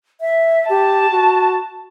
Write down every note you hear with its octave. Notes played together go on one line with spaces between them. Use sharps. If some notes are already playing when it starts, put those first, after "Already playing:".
E5
G4 A5
F#4